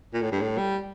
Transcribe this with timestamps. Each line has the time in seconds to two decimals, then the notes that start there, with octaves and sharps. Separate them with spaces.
0.13 A#2
0.22 A2
0.32 G2
0.41 A2
0.58 G3